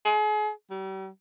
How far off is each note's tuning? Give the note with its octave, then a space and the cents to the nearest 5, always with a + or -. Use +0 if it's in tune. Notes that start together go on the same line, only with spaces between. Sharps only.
G#4 +35
G3 -40